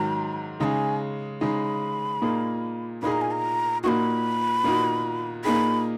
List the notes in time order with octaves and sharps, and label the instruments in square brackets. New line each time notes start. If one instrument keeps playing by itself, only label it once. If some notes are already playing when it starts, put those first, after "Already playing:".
Already playing: [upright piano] G#2 D#3 F#3 [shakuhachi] A#5
[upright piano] C#3 G#3 D#4 G#4 [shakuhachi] G#5 A#5
[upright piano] C#3 G#3 D#4 G#4 [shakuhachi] B5
[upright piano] A#2 A#3 D#4 G#4
[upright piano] A#2 A#3 D#4 G#4 [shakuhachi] B5
[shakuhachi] A#5
G#5
A#5
[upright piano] A#2 A#3 D#4 F#4 [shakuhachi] B5 C#6
[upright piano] A#2 A#3 D#4 F#4
[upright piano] A#2 A#3 D#4 G#4 [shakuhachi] B5